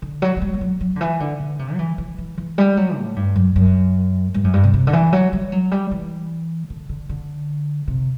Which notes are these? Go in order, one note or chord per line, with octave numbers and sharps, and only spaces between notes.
D3
F#3
F#3
G3
G3
F#3
F#3
D3
E3
D3
D3
C3
F#3
E3
E3
E3
E3
G3
F#3
A2
G2
F#2
F#2
G2
F#2
G2
C3
C3
D3
E3
F#3
G3
F#3
G3
E3
D3
D3
D3
C3